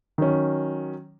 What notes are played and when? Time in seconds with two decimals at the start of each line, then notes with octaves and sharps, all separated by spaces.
0.18 D#3 F#3 C#4